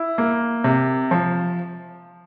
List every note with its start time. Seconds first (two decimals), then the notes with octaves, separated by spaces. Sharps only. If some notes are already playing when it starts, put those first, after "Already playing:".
Already playing: E4
0.18 A#3
0.64 C3
1.11 F3